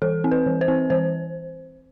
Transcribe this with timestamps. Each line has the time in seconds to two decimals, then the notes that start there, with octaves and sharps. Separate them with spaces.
0.02 E3 A4
0.24 C4
0.31 B4
0.46 E3
0.61 C5
0.68 C4
0.90 E3 C5